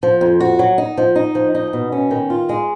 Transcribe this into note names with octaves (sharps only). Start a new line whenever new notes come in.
F3
F2
F#4
F#3
D#4
F3
D#4
F3
D#4
B2
C#4
D#3
F4
G#3